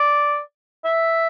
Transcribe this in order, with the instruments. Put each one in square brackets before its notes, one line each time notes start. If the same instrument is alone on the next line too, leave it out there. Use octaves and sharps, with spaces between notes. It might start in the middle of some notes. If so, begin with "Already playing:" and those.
Already playing: [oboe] D5
E5